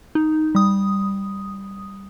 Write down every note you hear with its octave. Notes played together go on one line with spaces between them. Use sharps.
D#4
G3 D#6